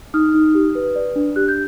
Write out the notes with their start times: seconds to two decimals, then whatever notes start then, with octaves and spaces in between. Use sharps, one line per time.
0.14 D#4 D#6 F6
0.34 D#4
0.55 G4
0.75 B4
0.95 D5
1.16 D4
1.36 G4 F#6
1.48 G6